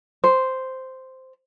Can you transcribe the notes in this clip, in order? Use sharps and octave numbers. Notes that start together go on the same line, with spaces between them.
C5